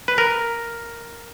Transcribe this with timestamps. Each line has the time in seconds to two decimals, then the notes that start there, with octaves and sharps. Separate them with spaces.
0.08 B4
0.18 A#4